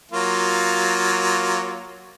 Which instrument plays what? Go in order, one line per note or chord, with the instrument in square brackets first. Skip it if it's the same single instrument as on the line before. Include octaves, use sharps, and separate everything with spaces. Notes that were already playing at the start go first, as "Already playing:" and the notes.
[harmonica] F#3 A#3 F4